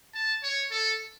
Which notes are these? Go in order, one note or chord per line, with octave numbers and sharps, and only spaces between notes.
A5
C#5
A4